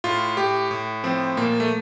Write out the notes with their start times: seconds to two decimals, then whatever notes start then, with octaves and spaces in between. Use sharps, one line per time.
0.04 A2 F4
0.37 A2 G4
0.71 A2
1.04 F3 C4
1.37 A#2 A#3
1.60 A3